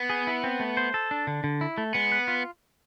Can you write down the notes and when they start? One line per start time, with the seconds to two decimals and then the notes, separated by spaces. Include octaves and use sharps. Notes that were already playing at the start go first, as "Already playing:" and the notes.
Already playing: B3
0.10 G#4
0.27 E4
0.44 C4
0.60 A3
0.77 C5
0.94 A4
1.11 D4
1.27 D3
1.44 D3
1.61 E4
1.78 A3
1.95 G#3 B3
2.12 B4
2.28 F4